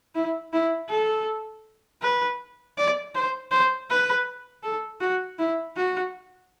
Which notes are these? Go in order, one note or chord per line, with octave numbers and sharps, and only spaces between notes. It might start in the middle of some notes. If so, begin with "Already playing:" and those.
E4
E4
A4
B4
D5
C5
C5
B4
A4
F#4
E4
F#4